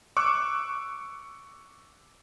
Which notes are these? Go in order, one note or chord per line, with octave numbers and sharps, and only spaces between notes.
C#6 D6 E6 F#6